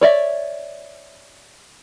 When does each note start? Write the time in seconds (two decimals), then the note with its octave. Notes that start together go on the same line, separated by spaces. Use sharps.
0.01 C#5 D5 E5